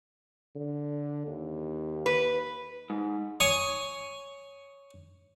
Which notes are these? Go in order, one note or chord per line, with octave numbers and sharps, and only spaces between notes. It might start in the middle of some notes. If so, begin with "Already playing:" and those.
D3
D#2
B4
G#2
C#5 G#5 C#6 D#6